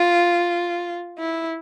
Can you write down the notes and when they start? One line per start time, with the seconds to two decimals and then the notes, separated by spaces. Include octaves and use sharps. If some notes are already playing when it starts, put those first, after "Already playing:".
Already playing: F4
1.19 E4